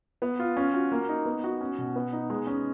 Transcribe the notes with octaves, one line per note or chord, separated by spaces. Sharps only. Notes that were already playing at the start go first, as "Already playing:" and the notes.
B3
F4
C#4
F#4
A#3
D#4
B3
F#4
C#4
B2
B3
D#4
G#3
C#4